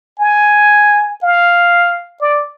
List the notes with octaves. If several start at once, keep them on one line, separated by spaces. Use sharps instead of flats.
G#5
F5
D5